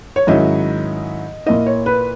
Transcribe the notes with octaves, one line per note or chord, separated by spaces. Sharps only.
C#5
G#2 D#3 F#3 C#4 E4 D#5
A#2 A#3 E4 D#5
C#5
B4